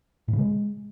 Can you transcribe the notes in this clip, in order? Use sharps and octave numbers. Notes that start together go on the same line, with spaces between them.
A2
C#3
G#3